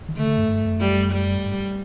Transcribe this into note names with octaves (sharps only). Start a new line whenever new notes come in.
D#3
D3 A3
D3
G2
G2
F#2
G3
G3
G2